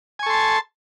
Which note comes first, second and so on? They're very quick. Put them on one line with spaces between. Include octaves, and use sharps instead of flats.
G#5 C#6 A4 C6 A5